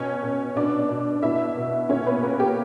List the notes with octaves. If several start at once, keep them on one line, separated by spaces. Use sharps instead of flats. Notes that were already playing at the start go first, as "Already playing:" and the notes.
Already playing: B2 C#4 C#5
B2
B2 D4 D5
B2
B2 E4 E5
B2
A#2 C#4 C#5
B3 B4
A#2 A#3 A#4
G4